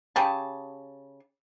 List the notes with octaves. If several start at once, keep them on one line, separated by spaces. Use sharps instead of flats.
C#3 G4 G#4 A5